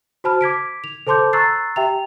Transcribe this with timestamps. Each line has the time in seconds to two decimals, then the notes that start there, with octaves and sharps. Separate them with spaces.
0.24 F#4 C5 A5 B5 F6
0.41 D6 G#6 B6 D7
0.84 F7
1.07 A4 C5 A5 C6 D6 G6
1.33 A#5 C#6 E6 F#6 A6 C7
1.76 G4 E5 G5 A#5 F7